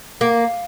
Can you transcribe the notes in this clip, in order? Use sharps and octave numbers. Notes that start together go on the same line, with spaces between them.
A#3